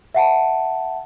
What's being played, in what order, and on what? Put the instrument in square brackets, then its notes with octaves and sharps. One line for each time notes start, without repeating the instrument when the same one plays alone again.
[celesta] E5 F#5 A5